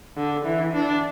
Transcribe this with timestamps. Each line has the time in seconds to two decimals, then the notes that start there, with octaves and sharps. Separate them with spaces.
0.17 D3
0.45 E3
0.74 D4